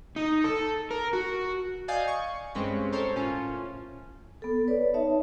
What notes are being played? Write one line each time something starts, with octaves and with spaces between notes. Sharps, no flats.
D#4
A4
A#4
F#4
D5 D#5 F5 G#5 D#6 G6
C#6
G2 G#3 C4 C#4 B5 C#6
A4 A#4 C5 C#5
A2 C#4 F4
B3 A4
B4 C#5 D5
D#4 C#5 E5 A5